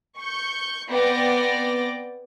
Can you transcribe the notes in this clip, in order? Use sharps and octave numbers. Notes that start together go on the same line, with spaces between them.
C#6 G6 C#7
B3 C4 D5 G5 D6 A#6